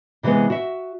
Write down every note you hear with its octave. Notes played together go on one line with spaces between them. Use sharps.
C3 E3 F#3 G#3 B3
F#4 E5